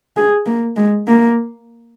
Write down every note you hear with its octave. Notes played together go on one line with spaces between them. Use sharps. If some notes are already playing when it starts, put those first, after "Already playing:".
G#4
A#3
G#3
A#3